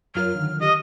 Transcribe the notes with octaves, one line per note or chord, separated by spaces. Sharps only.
F#2 F#3 F4 A#4 F6
D3 D#3
G4 D#5 D#6